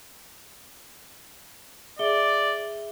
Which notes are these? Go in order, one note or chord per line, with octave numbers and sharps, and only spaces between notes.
G#4 D5 E5 G7